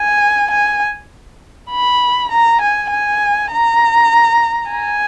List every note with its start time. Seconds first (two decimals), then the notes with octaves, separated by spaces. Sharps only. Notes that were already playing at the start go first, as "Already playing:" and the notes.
Already playing: G#5
0.51 G#5
1.71 B5
2.31 A#5
2.62 G#5
2.91 G#5
3.52 A#5
4.72 G#5